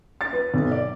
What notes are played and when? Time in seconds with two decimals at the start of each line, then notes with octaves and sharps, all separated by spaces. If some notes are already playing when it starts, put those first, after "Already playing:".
0.21 A6
0.33 B4
0.54 B1
0.71 D5